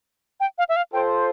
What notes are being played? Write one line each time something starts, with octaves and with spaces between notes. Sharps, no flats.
G5
F5
E5
F5
F4 A4 C5 G5